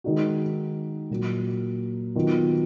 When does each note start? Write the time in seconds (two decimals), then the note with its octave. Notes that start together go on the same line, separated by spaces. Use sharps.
0.04 D#3 G#3 D#4 F#4
1.10 A#2 F#3 A#3
2.15 D#3 F#3 B3 F4